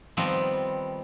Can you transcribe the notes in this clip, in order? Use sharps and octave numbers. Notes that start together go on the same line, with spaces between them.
D#3 F3 G3 B3 C4